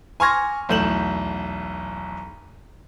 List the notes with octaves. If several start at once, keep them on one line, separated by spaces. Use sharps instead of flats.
G#5 C6 C#6 F6 G#6 A#6
B1 E2 A3 G6 E7 F#7